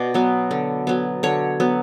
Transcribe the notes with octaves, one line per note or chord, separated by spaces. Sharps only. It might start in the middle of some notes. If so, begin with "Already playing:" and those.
Already playing: B2 D5
F#3 B3
D3
F#3 B3
D3 C#5
F#3 B3